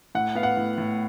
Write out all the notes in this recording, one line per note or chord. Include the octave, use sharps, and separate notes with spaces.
A2 F#5
B3 F5
F#5
A2
A2